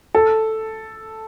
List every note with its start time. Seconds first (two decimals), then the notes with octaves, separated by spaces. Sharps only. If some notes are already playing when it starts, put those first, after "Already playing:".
0.15 A4